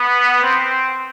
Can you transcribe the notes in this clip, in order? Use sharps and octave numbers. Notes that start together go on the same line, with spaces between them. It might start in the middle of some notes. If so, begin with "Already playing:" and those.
Already playing: B3
C4